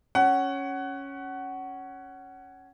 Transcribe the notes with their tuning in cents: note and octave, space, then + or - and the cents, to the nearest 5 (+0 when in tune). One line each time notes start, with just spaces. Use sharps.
C#4 +0 F#5 +20